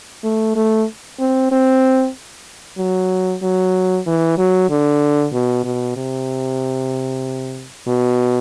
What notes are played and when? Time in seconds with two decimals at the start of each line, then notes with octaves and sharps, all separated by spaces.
0.24 A3
0.56 A3
1.20 C4
1.52 C4
2.78 F#3
3.42 F#3
4.06 E3
4.38 F#3
4.70 D3
5.33 B2
5.64 B2
5.97 C3
7.87 B2